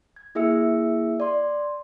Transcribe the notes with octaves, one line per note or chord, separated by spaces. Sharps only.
G#6
A#3 E4 G#4 E5 E6 C#7
D5 C6